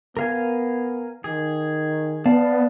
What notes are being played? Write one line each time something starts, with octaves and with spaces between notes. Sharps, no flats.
B3 A#4 F5 G#5
D#3 G#4
B3 D5 F5 A5